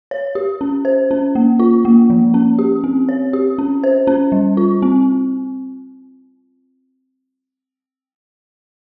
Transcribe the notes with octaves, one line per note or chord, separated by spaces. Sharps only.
C#5
G4
C#4
C5
C#4
A#3
F4
A#3
F3
C#4
G4
C4
C#5
G4
C#4
C5
C#4
G3
F4
C4